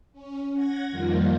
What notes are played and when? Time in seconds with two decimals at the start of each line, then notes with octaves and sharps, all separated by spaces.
0.13 C#4
0.54 F#5 G#6 A#6
0.91 F2 D#3 F3 G3 A#3 F4